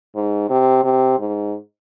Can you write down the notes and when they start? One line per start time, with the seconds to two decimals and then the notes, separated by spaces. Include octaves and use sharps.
0.16 G#2
0.50 C3
0.84 C3
1.19 G#2